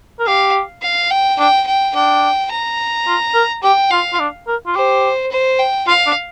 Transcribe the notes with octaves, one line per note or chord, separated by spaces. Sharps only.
A#4
G4 F5
F5
G5
D4 G5
G5
D4 G5
A#5
F4
A#4
G4 G5
F4 F5
F4
D4
A#4
F4
G4 C5
C5
G5
F4 F5
D4